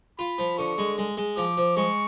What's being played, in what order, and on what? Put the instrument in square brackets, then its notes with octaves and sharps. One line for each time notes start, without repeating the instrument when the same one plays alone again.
[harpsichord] F4 [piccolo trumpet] B5
[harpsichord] F3
[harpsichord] D3 [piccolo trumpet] C#6
[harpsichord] G#3
G#3
G#3
[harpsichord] F3 [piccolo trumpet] D6
[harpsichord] F3
[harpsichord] G#3 [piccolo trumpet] C#6